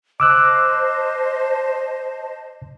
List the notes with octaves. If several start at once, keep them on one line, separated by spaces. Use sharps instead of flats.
C5 D#5 A5 D6 E6 F#6